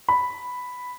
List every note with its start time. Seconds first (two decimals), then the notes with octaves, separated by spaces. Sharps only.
0.08 B5